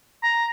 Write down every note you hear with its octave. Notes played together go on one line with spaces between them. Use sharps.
A#5